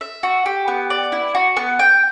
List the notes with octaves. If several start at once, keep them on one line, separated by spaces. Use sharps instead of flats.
E5
F#4
G4
B3
D5
E4
F#4
B3
G5